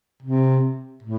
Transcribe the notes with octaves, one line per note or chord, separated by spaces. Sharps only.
C3
A2